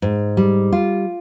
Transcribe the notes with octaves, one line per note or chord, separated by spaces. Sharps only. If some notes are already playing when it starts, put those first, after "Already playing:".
G#2
G3
F4